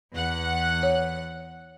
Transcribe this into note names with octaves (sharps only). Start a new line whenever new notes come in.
E2 F#5
C#5